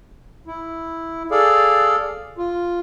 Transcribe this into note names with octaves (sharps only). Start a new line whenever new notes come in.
E4
G#4 A4 D5 F5
F4